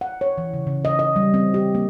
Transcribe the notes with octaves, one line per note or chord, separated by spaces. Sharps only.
F#5
C#5
E3
C#3
C#3
D#5
D#5
G3
C4
G4
A#3